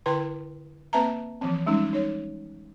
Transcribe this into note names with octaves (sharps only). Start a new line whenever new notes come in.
D3 E4 B4 G5 C6
A#3 C4 B4 E5 A5 A#5
E3 F3 C4
G3 G#3 C#4 D#4
D#4 C#5